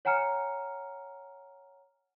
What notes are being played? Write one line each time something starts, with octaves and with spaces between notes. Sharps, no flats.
C#5 F#5 G#5 A#5 F6 C#7